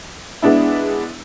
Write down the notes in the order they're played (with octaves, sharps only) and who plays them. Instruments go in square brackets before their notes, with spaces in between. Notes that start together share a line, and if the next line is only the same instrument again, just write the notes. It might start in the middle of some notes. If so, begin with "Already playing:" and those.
[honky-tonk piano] G#3 B3 D4 E4